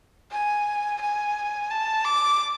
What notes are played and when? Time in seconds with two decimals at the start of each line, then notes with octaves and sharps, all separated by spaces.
0.31 G#5
1.01 G#5
1.71 A5
2.05 D6